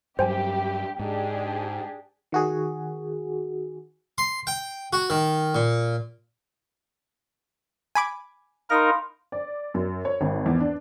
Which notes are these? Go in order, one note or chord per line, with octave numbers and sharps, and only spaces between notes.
G2 F#3 G4 C5 G5 G#5
G#2 D4 G4 G#4
D#3 F#4 G#4
C6
G5
F#4
D#3
A#2
G#5 B5 D6
D#4 A#4 F5 B5 C6
D5
F#2
C#5
G#1
E2
D4